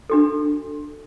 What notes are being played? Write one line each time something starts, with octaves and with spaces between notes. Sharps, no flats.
D4 F#4 A4